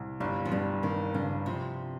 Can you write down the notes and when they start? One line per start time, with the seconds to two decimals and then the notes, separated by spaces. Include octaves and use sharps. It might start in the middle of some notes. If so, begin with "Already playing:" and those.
Already playing: C2
0.20 G1 G3
0.45 F3
0.52 G2 G3
0.83 G2 D#3
1.14 G2 C#3
1.45 C3 F3